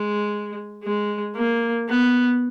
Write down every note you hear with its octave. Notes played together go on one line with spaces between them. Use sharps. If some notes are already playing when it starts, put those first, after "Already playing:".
Already playing: G#3
G#3
A#3
B3